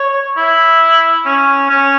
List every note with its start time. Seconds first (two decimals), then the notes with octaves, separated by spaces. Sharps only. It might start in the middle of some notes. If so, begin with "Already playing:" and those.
Already playing: C#5
0.37 E4
1.25 C#4
1.69 C#4